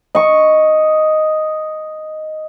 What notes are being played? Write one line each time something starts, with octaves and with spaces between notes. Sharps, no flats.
D#5 C#6